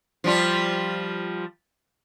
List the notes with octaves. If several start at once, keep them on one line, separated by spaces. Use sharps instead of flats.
F3 G3 F4